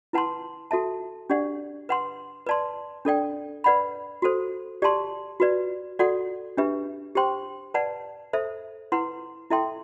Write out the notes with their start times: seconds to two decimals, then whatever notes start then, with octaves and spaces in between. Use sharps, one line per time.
0.13 E4 B4 F#5 A5 C6
0.71 F#4 A4 E5 A5
1.30 D4 G4 D5 F#5
1.89 B4 F#5 C6
2.46 B4 D5 A5 C6
3.05 D4 A4 D5 G5
3.64 B4 D5 F#5 B5
4.22 F#4 A4 C5
4.82 G4 D5 A5 C6
5.40 F#4 B4 D5
5.99 F#4 A4 D5 F#5
6.57 D4 G4 B4 E5
7.15 G4 C5 G5 C6
7.74 B4 D5 F#5 A5
8.33 A4 C5 E5
8.92 E4 B4 F#5 C6
9.50 E4 A4 E5 G5 C6